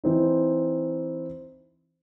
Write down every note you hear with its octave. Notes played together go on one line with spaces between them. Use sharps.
E3 C4 D#4